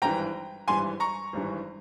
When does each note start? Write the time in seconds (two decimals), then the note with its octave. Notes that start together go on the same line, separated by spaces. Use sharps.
0.02 G#1 G2 E3 G5 A#5
0.68 G#1 G2 E3 G#5 C6
1.00 A#5 C#6
1.33 G#1 G2 E3